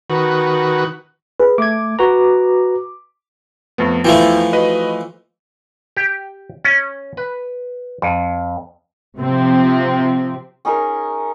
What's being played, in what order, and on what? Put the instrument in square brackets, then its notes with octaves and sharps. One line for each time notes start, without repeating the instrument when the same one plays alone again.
[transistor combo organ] D#3 F#4 B4
[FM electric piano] G#4 B4
[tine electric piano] A3 G#6 [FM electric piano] D6
[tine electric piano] F#4 B4 A#5
[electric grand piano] F2 A3 B3
[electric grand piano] E2 E4 G5 [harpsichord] E3 F3 A3
[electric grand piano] F#4 B4 D#5
[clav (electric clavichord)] G4
C#4
B4
F2
[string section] C3 F3 C4
[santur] C#4 D#4 G#4 A#4